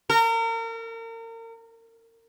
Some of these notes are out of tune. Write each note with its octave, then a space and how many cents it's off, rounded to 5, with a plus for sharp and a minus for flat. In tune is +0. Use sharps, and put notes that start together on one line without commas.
A#4 -35